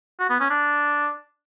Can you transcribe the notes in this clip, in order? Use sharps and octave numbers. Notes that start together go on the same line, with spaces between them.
F#4
B3
C#4
D4